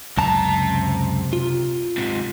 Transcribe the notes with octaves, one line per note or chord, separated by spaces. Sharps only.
C#2 F#2 C3 A5 A#5
F4
G#2 C3